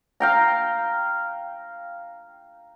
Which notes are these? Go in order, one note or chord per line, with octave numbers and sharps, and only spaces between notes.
F5 G5 A#5